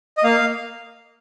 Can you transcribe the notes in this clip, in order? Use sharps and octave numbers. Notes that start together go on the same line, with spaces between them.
D#5
A#3 F5